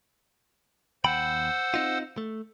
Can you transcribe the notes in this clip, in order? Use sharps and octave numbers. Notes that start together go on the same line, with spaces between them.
D#2 C5 F#5 G5 B5 E6
C4 D#4 F4
A3